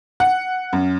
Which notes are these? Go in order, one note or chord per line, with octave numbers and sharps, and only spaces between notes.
F#5
F#2